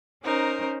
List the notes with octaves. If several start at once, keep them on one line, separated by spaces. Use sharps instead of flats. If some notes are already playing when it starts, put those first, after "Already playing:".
C#4 D#4 A#4 C5